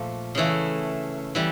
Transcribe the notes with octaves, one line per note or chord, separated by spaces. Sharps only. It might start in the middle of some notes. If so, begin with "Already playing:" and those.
Already playing: A#2 F3 A3
C#3 E3 A3
E3 G3